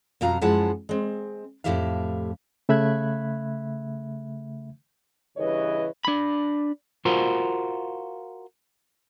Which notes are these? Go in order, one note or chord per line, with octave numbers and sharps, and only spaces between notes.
F2 B2 F3 F#3 F5 A#5
F#2 F3 G#3 E4 F#5 A5
G#3 C4
F2 A2 F#3 G4 E5 F5
C#3 A3 E5 B5 F#6 G#6
G2 C#3 E3 B4 C#5 D#5
D4 B5
F4 F#4 A#4 C5